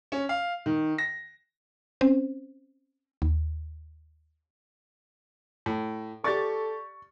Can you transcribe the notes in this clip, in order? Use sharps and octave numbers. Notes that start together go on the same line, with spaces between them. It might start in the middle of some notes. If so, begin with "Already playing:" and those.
C#4
F5
D#3
A#6
C4 C#4 C5
D#2
A2
G4 A4 D5 C#6 A6